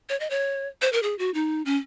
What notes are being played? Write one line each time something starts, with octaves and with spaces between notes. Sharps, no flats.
C#5
D#5
C#5
C5
A#4
G#4
F#4
D#4
C#4